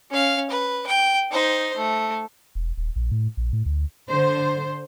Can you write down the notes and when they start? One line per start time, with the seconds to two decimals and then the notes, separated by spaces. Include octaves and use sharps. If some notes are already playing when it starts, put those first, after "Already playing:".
0.10 C#4 F5
0.50 B4
0.87 G5
1.31 D#4 C5
1.76 A3
2.55 E1
2.77 D#1
2.96 A#1
3.11 A2
3.37 A#1
3.53 A2
3.66 D2
4.09 D3 C5